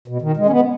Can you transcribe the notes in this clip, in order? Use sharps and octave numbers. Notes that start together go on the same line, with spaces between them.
B2
D#3
G#3
C#4
B3